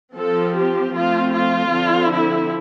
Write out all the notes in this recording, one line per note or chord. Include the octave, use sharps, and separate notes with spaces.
F3 C4 A4
G4
F3 A3 C4 F4
F4
D3 F3 C4
E4